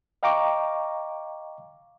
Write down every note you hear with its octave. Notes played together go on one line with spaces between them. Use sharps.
D#5 F5 G5 A#5 C#6 D6